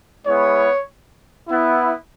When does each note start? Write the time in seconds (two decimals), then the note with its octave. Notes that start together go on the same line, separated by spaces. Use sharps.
0.25 G#3 B3 E4 C#5
1.48 B3 E4